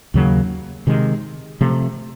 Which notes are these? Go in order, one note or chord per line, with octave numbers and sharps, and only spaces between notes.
D#2 C#3 F#3 A#3
C3 D#3 G#3
C3 F3 A3